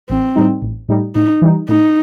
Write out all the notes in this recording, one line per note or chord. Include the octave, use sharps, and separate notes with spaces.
A1 C4
A2 G3 D#4
A1
A2 G3 D#4
A2 D#4
E3 G3 D#4
A2 D#4